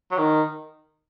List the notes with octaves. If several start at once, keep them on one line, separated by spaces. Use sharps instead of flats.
F#3
D#3